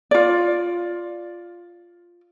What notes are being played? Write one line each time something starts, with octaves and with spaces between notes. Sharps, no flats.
F4 D5